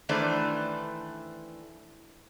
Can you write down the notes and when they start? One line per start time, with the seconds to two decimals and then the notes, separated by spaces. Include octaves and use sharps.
0.09 D#3 E3 A3 D4 B4 C5